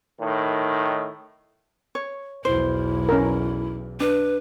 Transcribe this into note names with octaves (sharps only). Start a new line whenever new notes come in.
A2 D#3
C#5
B1 E2 E4 C5
C#4 A#4
D4 B4